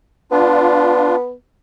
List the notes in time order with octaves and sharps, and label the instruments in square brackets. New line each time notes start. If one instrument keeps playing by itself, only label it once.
[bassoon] B3 [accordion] D4 F4